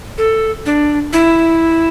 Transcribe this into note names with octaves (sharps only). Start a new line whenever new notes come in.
A4
D4
E4